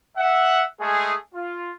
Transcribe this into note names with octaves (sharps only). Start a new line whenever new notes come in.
E5 F#5
G#3 A3 G#4
F4